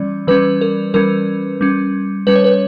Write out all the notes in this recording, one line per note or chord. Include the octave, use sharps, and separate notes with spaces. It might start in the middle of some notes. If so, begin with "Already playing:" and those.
Already playing: E3 G3 C#4 D5
E3 G3 C#4 B4
A#4
E3 G3 C#4 A#4
G3 C#4
G3 C#4 B4
C#5
B4